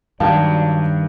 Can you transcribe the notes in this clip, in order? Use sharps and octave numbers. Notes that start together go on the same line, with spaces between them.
G2 D#3 F#3 D5 F5 A5